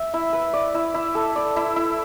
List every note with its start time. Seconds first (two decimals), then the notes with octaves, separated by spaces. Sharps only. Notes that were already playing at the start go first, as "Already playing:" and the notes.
Already playing: E5
0.14 E4
0.33 B4
0.53 D5
0.75 E4
0.94 E4
1.15 A4
1.36 D5
1.56 E4
1.76 E4